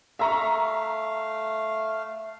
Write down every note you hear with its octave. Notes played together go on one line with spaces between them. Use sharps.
A3 E5 F5 A#5 C#6